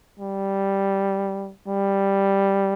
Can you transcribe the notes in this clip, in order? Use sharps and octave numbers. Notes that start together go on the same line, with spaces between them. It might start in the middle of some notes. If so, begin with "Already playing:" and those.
G3
G3